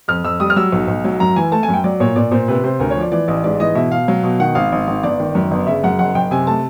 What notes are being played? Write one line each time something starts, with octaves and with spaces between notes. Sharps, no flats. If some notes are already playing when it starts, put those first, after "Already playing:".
F2 F6
F2 E6
G3 D#6
F6
F#3 E6
B1
B1
F#3
F#2 A#5
E3 G#5
A3 A5
G#5
F#2
G5
F#3 D5
A#2 C#5
A#2 D5
A#2 C5
C3 B4
C3 C5
D2 A#4
C#5
F3 D5
E3 D5
A1 D5
G#2 D5
E3 D#5
B2 E5
B2 F5
F#3
B2
D#3 F#5
G#1 F5
G#1
G#1
G1 D5
D#3
F#2
G1
C#3 E5
F#2 F#5
F#1 F#5
F#1 G5
C3 G#5
A3 A5